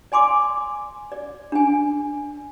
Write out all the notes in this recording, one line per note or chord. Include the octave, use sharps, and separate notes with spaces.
D5 G#5 C6 D6
D5
D4 G#5